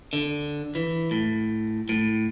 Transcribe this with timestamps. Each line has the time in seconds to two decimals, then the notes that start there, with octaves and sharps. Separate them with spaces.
0.13 D3
0.75 E3
1.11 A2
1.89 A2